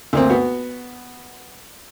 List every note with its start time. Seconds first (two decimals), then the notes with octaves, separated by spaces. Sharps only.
0.13 D2 A#3 C4
0.30 B3 F#4